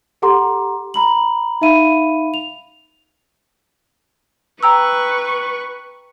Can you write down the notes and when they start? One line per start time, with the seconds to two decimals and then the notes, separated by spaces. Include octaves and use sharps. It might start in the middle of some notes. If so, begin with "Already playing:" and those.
0.22 G4 A4 F#5 A#5 C6 D6
0.94 A#5 B5 F#7
1.61 D#4 E5 F5 B5 D#7
2.34 F7
4.63 B4 G5 A#5 C#6 E6